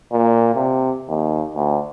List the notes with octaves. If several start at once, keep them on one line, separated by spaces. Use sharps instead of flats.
A#2
C3
D#2
D2